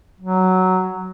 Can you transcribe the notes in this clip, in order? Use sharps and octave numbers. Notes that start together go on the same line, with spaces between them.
F#3